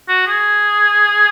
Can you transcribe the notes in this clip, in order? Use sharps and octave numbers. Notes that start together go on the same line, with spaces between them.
F#4
G#4